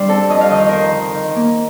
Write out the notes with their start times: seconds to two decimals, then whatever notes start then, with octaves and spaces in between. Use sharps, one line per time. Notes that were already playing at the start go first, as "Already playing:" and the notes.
Already playing: G3 D4 C5 D5
0.09 C4 A4
0.30 F2 D#5
0.41 F5
0.51 D#3 D#5
0.69 D#4 A#4 C5
0.94 D#3
1.15 D#3
1.36 A#3